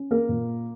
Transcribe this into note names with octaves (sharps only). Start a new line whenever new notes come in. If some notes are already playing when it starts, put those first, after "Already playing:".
Already playing: C#4
A#3 A#4
A#2